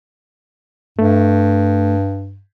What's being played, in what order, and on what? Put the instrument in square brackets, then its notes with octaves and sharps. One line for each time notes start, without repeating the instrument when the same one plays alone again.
[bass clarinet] G2 [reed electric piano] A3